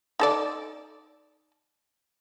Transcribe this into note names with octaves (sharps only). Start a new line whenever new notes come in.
D#4 A4 D5